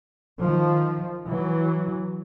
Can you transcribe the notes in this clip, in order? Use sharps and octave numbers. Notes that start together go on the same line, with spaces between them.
D#3 F3
E3 F#3